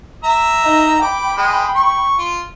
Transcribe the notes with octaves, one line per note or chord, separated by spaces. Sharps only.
E5 A#5
D#4 D#5
G5 B5 D6
G#3
C#6
F4